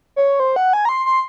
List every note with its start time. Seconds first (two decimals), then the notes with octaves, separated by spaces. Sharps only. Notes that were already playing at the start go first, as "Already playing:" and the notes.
0.16 C#5
0.40 C5
0.56 F#5
0.73 G#5
0.85 A#5
0.89 C6
1.06 C6